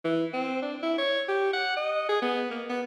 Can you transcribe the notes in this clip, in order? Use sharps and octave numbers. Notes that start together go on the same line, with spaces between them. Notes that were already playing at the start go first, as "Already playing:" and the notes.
E3
C4
D4
E4
C#5
G4
F#5
D#5
G#4
B3
A#3
B3